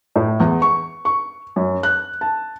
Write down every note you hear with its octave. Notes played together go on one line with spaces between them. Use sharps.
A2
E2
C#6
C#6
F#2
F#6
A5